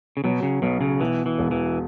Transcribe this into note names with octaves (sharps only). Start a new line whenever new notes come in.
C#3
B2 F#3
C#3
B1 B2
C#3
B2 E3
E3
E1
E3